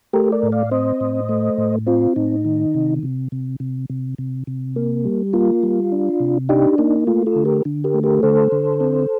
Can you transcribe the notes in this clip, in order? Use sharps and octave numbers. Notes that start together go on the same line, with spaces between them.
A3 G4 A#4
A#4 D5
A2
D5 F5
C4 C5 D#5
A2
A3
A2
C4 F4
A2 D#4
D#3
C3
C3
C3
C3
C3
C3
C3
A#3
G3
A#3 F4
G3
D4
C3
D4 D#4 G4
A#3 D#4
A3 F4
F4 A4
D3
G4 A#4
D3
G4 A#4
A3
G4 A#4
D3 A4 C5
D3
C4